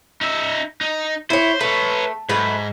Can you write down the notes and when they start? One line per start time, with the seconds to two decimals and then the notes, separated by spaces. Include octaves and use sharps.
0.21 D#4 E5
0.81 D#4
1.30 E4 C5 C#5
1.60 A3 B4 C#5
2.29 G#2 F#3 A3 B4